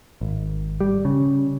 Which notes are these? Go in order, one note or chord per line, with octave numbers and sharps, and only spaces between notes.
G#1
G3
C#3